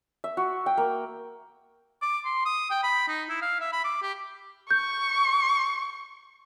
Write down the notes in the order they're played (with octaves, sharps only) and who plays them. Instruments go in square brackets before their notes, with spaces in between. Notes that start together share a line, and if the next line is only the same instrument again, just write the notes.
[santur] E5
F#4
G5
A#3
[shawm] D6
C6
D#6
G5
B5
D#4
E4
F5
E5
B5
D6
G4
[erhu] C#6 [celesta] G6